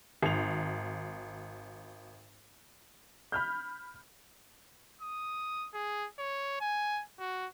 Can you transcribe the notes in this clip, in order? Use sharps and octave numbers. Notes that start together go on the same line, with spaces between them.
G#1 F7
B5 F6 G6
D#6
G#4
C#5
G#5
F#4